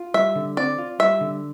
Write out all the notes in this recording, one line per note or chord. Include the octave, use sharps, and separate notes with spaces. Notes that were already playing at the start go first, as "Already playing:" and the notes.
Already playing: F4
G3 E5
D3
C4 D5
F4
G3 E5
D3